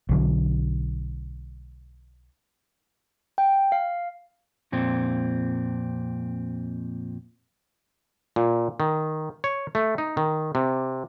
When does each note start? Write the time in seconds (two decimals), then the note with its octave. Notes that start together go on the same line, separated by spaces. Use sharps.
0.09 B1 D3 F#3
3.38 G5
3.72 F5
4.72 F2 A#2 C4
8.36 A#2
8.80 D#3
9.44 C#5
9.75 A3
9.98 D#4
10.17 D#3
10.55 C3